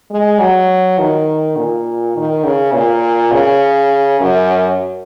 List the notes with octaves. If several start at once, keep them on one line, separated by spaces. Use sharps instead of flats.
G#3
F#3
D#3
A#2
D#3
C#3
A#2
C#3
F#2